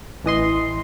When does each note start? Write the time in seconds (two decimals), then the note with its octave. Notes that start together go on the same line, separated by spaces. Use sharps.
0.24 A1 E3 D#5 C6